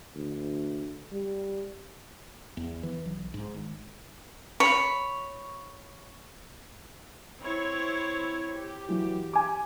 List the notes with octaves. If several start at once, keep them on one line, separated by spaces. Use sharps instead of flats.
D2
G3
E2
E3
B1
G#2
G#1
C#5 B5
C4 E4 C#5
G4
E3 F#3
G#5 D6